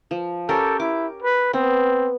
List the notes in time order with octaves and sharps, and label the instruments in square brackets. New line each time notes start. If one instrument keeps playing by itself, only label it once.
[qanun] F3
[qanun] C#4 G4 A#4 [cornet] A4
[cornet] E4 [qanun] D6
[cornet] B4
[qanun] B3 [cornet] C4